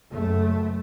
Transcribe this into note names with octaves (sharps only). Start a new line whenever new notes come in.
F#1 F#2 A3